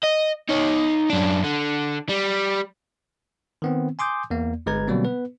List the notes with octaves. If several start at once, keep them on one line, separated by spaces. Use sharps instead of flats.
D#5
D#4 C#5
F#2 D4
D3
G3
D#3 B3 C4
G#5 C6 D6 D#6 G6
E2 A#3
G1 G#3 B4 A#5 G#6
B2 D3 F#3 G3 A#3 C4
B3 B4